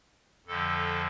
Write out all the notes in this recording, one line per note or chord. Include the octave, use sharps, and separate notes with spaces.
F2 D3 F3 A4